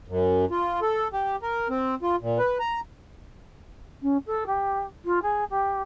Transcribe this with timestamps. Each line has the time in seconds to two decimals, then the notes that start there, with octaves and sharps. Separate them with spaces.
0.08 F#2
0.51 F4
0.82 A4
1.13 G4
1.42 A#4
1.70 C4
2.03 F4
2.21 A#2
2.39 B4
2.59 A#5
4.02 C#4
4.26 A4
4.46 G4
5.05 F4
5.22 G#4
5.50 G4